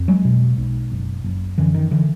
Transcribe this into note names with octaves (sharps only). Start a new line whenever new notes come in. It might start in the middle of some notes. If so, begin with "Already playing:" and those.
Already playing: F2
F#3 G#3
B2
B1
F#1
F#1
F#2 D3 E3
D#3
D3 E3